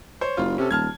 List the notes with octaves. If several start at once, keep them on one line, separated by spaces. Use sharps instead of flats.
C5 C#5
F#1 F4
C3 C#4 A4
D#1 A5 F6 G#6